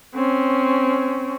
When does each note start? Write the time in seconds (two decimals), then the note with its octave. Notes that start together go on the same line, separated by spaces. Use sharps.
0.15 C4 C#4